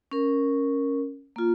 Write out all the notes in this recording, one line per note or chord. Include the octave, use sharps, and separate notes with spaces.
C#4 A#4
A#3 F4